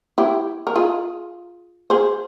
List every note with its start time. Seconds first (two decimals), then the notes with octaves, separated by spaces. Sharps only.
0.18 E4 G4
0.67 A#4
0.76 F4 G#4
1.90 G#4 C5